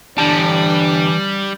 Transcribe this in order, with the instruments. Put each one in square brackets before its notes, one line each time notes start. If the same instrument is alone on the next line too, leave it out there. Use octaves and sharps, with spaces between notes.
[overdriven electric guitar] D3 G4 [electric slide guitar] E3 A5 [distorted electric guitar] G3 [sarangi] D4